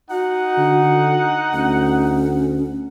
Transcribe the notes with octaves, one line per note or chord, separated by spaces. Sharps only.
D#4 F#4 F#5
D3
D2 C#4